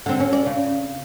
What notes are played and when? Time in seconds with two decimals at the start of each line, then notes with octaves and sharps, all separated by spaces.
0.06 D3 C4
0.20 C#4
0.33 D5
0.46 C#3